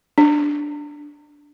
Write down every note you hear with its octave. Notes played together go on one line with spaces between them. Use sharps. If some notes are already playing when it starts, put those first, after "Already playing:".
D4